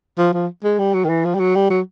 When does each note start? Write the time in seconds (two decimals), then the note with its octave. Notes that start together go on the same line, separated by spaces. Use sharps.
0.18 F3
0.33 F3
0.64 G#3
0.79 G3
0.94 F#3
1.05 D#3
1.09 E3
1.25 F3
1.34 G3
1.40 F#3
1.55 G3
1.70 F#3